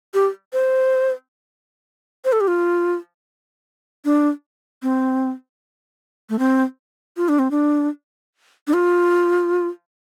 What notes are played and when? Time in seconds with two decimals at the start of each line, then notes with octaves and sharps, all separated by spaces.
0.14 G4
0.53 C5
2.25 C5
2.32 A4
2.41 G4
2.48 F4
4.05 D4
4.83 C4
6.30 A3
6.39 C4
7.17 F4
7.29 D4
7.39 C4
7.51 D4
8.67 D4
8.73 F4